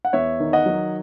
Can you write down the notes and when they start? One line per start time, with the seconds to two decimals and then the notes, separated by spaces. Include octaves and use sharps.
0.05 F#5
0.13 E2 C#5 E5
0.40 D#3
0.53 D#5 F#5
0.66 F#3